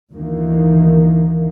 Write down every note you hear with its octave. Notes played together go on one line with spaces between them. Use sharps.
D2 D#3 E3 A#3